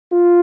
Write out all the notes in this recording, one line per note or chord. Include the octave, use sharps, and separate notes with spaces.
F4